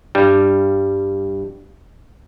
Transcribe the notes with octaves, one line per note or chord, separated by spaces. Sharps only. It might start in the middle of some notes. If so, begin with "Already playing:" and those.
G2 G3